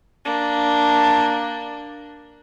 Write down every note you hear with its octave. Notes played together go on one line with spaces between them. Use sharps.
A#3 D4